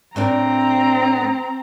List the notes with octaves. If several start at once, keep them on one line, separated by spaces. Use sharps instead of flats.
A2 C4 D4 A#4 A#5